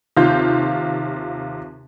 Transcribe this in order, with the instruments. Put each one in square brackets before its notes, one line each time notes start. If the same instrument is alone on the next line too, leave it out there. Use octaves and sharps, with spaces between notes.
[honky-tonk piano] D#2 C3 F4 G6